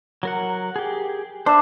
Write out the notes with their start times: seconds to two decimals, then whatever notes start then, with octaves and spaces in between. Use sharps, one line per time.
0.23 F#3 A#4 F#5
0.76 G4 G#4
1.46 D4 C5 E5